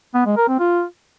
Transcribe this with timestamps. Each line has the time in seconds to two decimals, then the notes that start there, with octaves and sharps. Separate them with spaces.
0.15 B3
0.26 G#3
0.37 A#4
0.48 C4
0.59 F4